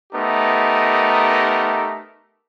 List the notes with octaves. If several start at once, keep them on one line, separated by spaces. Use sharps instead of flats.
A3 B3 D#4 G4 A#4